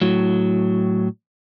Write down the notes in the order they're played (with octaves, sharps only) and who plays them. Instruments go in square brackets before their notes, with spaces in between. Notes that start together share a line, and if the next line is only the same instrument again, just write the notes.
[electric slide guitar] A2 F#3